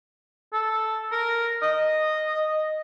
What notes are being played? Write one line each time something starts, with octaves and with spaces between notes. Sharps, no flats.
A4
A#4
D#5